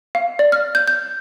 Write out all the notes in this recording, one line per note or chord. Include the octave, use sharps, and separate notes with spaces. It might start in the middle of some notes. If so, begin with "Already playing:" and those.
F5
D5
F6
G6
G6